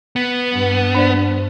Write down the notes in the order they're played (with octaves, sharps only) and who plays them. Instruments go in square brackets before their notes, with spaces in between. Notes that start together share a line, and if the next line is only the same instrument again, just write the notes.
[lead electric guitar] B3
[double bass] G2
[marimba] D4 C5 D5